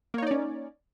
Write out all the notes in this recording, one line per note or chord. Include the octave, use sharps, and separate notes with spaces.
A#3 C#4 D#4 C#5 D5